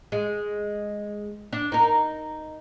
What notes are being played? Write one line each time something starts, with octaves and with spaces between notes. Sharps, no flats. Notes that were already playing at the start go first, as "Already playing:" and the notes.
G#3
D4
D#4 A#4